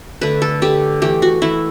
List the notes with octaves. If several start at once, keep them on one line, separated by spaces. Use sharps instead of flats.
D3 A3 B4
A4
D3 A3 G4
E3 A3 G4
F#4
E3 A3 E4